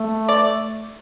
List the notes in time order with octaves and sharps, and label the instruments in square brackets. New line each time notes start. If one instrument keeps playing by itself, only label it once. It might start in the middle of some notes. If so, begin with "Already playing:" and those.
Already playing: [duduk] A3
[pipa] D5